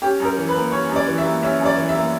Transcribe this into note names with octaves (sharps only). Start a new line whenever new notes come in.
C#4 G4
F#2 A#4
E3
B4
A#3
C#4 C#5
F#2
D5
E3
E5
A#3
C#4 E5
F#2
D5
E3
E5
A#3